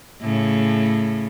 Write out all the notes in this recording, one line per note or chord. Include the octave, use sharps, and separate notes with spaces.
A2 C#3